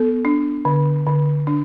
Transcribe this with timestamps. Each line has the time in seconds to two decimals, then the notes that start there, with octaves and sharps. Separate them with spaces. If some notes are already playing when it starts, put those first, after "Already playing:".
Already playing: B3 A4
0.25 D4
0.65 D3
1.06 D3
1.47 D4